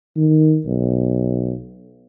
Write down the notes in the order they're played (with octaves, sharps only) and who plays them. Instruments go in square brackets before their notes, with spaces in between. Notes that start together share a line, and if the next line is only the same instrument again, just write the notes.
[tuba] D#3
B1